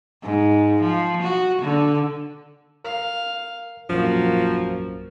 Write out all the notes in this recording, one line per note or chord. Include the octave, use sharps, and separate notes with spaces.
G#2
F3
F#4
D3
A#4 F5 C7
A#1 F#2 F3 A#3 F#4